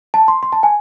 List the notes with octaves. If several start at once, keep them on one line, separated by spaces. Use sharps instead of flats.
A5
C6
C6
A5
G#5